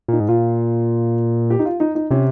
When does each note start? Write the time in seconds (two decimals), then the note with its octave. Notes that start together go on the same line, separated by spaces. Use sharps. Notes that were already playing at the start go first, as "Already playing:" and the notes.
0.08 A#2 D#4
0.20 G#2
0.28 A#2 F4
1.50 G4
1.59 D#4
1.65 F4
1.80 D#4
1.95 D#4
2.11 C3 C#4